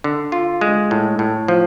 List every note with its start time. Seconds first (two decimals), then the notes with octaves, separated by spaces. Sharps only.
0.04 D3
0.32 F4
0.61 G#3
0.91 A2
1.19 A2
1.48 F3